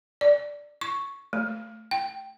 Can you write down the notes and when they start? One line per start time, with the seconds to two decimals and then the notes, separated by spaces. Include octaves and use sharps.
0.21 D5
0.81 C#6
1.33 A3
1.91 G5